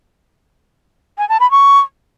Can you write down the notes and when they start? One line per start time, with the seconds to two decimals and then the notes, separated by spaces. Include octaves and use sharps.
1.18 G#5
1.29 A5
1.40 B5
1.51 C#6